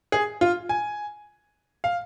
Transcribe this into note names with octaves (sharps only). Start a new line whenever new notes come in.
G#4
F4
G#5
F5